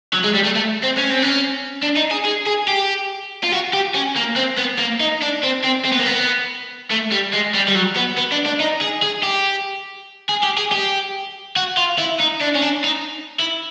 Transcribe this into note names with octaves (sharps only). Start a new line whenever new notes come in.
F#3
G#3
G3
A3
A3
C4
C#4
C4
C#4
D4
D#4
G#4
G#4
G#4
G4
F4
F#4
G4
C#4
A#3
C4
B3
A#3
D#4
D4
C4
C4
C4
B3
A#3
B3
A3
G3
G#3
G3
G3
F#3
B3
B3
D4
D4
D#4
G#4
G#4
G4
G#4
G4
G#4
G4
F#4
F4
E4
D#4
D4
C#4
D4
D#4
E4